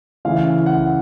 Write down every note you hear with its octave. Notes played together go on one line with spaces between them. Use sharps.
C#3 E3 A3 C#4 E4 F5
F#5